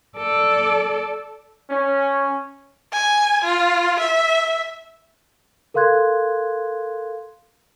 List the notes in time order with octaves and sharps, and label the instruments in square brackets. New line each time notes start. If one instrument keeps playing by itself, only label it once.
[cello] A4 D5
[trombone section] C#4
[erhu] G#5
F4
E5
[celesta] A4 A#4 F5 C6 F#6 G#6